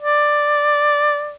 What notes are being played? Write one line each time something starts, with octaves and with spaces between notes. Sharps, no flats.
D5